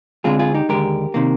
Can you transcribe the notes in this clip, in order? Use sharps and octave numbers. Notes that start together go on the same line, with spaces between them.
D2 D3 G#3 C4 F4 G#4
F4 G#4
D#4 G4
D#2 D3 G#3 G4 A#4
C3 D#3 A#3